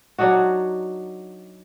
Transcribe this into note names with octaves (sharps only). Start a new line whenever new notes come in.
F#3 D4 D#4 F#4